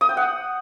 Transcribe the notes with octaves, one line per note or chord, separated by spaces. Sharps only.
D#6
G5
F#5